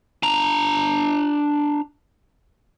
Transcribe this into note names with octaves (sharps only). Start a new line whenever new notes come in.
D4 A#5